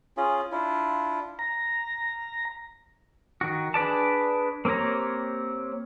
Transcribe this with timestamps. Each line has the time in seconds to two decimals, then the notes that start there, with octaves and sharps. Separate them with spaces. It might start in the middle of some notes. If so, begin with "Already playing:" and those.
0.17 C#4 F4 G#4
0.52 D4 E4 F4
1.39 A#5
3.41 D#3 F#4
3.74 D4 G#4 B4 D5 A5
4.65 A#3 C4 G4 C#5 A#5